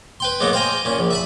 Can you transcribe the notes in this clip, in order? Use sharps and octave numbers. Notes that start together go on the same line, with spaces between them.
B4 G5 C6
G#2 F#3 A#3 B3
C5 F5 G5 G#5 A#5
A#2 C#4
A#1
E5 A5 B5